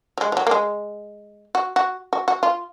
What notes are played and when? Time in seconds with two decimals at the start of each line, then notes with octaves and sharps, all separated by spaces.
0.18 F#3
0.21 G#3
0.32 F3
0.37 F#3
0.47 A#3
0.51 G#3
1.55 F#4
1.76 F#4
2.13 F#4
2.28 F#4
2.43 F4